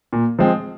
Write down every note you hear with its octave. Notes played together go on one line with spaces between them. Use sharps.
A#2
F3 G#3 C4